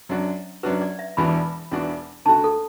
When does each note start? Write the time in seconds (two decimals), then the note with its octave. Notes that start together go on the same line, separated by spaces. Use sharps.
0.09 F#2 F#3 D4 F#4
0.63 F#2 F#3 D4 F#4 B4
0.82 D5
0.99 E5
1.17 E1 E2 E3 D4 F#4 B5
1.71 E1 E2 E3 D4 F#4
2.25 D2 D3 A3 F#4 A5
2.44 A4